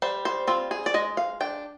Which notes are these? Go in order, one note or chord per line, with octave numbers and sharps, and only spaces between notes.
G3 C5
C5
C4 F4
G#4
D5
G#3 D#5
F5
D4 G5